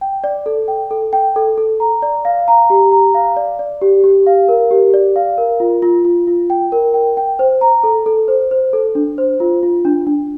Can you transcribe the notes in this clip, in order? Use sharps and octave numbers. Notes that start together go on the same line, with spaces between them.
G5
D5
A4
G5
A4
G5
A4
A4
A#5
D5
F5
A#5
G4
A#5
F5
D5
D5
G4
G4
F5
A#4
G4
D5
F5
A#4
F4
F4
F4
F4
G5
A#4
G5
G5
C5
A#5
A4
A4
C5
C5
A4
D4
C5
F4
F4
D4
D4